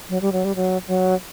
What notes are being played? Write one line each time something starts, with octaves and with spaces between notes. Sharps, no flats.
F#3
G3
F#3
G3
F#3
F#3